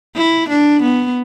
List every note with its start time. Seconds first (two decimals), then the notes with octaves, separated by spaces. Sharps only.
0.16 E4
0.49 D4
0.82 B3